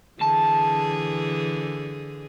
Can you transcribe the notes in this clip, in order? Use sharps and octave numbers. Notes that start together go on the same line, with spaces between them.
D3 E3 G#4 A5